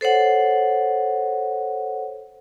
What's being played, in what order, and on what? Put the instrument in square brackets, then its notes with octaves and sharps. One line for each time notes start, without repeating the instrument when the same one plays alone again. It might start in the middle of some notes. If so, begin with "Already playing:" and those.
[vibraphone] A4 C5 C#5 F#5